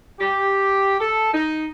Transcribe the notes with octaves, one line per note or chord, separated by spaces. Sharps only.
G4
A4
D#4